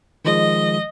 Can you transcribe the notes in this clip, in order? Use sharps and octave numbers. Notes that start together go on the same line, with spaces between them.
D#3 F3 G#3 D#5